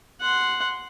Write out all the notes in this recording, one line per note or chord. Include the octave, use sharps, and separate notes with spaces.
F#5 C6